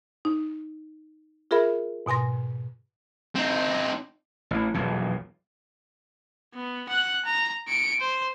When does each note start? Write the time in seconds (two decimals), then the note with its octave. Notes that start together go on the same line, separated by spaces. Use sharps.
0.25 D#4
1.51 F4 G#4 A#4 E5 B5
2.06 G#2 B2 G#5 C6 A#6
3.35 C4 D#4
4.51 A1 E3
4.74 E1 B1 F2 A#2
6.55 B3
6.89 F#5 F#6
7.25 A#5
7.68 C#7 D7
8.00 C5